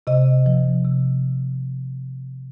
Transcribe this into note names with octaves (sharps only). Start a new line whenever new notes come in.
C3 D#5
F3
C3